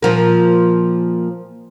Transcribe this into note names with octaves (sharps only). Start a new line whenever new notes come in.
A#2 F3 A#3